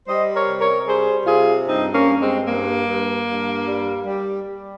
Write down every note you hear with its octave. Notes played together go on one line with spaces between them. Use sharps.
G3 C5 D#5
A#4 C#5
C3
A#4 C#5
G3 G#4 C5
C3 F4 G#4
G2 C4 D#4
A#3 C#4
G2
G#3 C4
G2 A#3
G2
G2
G3
G3
G3